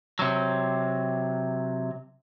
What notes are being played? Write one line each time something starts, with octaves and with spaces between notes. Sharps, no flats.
C3 F#3